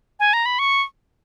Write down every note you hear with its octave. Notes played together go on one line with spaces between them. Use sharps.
G#5
A#5
B5
C#6